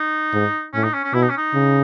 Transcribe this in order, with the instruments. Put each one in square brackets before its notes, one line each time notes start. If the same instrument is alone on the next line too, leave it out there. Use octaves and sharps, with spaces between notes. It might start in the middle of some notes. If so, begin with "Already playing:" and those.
Already playing: [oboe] D#4
[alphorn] G#2
[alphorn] A2 [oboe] C#4
[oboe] D#4
C#4
C#4
[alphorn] B2 [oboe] E4
[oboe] D#4
C#4
D#4
[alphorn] C#3